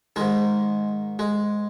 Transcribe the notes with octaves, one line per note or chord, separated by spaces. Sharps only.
G#2 D#3 G#3
G#3